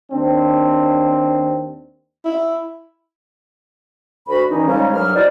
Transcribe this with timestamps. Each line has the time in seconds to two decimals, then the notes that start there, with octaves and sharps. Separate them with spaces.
0.11 D#2 C4 D4
2.25 E4
4.28 D2 F#4 B5
4.50 A#2 D#3 E3 C#4 D#4
4.67 C#3 F3 G3 G#3 C#4 D#4
4.94 C2 G2 F#3 G4 F6
5.15 F#3 D#4 E4 C5 D5